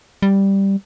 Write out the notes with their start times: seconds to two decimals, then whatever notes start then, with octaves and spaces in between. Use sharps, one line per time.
0.22 G3